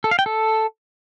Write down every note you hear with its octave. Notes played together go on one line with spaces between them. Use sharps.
A4
F5
G5
A4